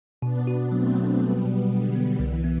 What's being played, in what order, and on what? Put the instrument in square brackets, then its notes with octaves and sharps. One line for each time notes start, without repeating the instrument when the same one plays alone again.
[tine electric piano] B2 [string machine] B3 D4
[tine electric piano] F#4
[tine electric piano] F#3 [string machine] A3 C4
[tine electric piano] F#3
[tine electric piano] F#3 [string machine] G3 B3
[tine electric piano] B2
[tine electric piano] B2 [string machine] D3
[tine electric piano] B3
[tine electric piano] C2 [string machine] E3
[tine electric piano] B3